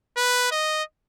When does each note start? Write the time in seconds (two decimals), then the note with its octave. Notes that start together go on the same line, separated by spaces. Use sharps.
0.17 B4
0.52 D#5